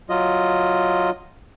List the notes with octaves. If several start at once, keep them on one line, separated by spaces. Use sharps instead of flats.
F#3 F4 D#5